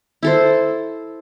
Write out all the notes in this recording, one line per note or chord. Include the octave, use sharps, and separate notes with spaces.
E4 A4 C5